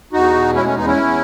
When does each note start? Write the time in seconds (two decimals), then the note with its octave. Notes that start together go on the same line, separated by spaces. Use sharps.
0.13 E2 D#4 F#4
0.34 B2
0.54 G#3 C#4 E4
0.65 A3 C#4
0.75 E2 B3 D#4
0.86 C#4 E4
0.97 E2